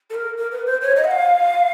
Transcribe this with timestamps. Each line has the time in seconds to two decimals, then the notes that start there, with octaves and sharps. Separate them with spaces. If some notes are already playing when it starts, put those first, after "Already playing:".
0.10 A4
0.14 A#4
0.37 A#4
0.52 B4
0.66 C5
0.82 C#5
0.96 D#5
1.05 F#5
1.11 F5